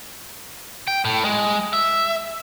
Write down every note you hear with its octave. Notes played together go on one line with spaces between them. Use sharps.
G5
A2
G#3
E5